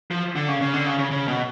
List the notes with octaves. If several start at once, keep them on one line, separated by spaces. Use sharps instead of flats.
F3
D3
C#3
C#3
D3
C#3
C#3
C#3
B2